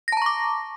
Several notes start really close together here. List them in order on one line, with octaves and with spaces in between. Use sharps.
A#6 A5 A#5 C#6 D6